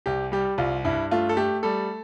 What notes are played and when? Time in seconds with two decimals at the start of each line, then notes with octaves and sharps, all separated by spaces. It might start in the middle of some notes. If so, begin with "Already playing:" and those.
0.06 C2 G4
0.32 G3 G4
0.58 C2 F4
0.85 G2 E4
1.11 A3 F4
1.29 A4
1.37 A3 G4
1.63 G3 A4